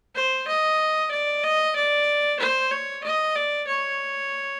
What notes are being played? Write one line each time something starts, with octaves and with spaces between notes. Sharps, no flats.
C5
D#5
D5
D#5
D5
C5
C#5
D#5
D5
C#5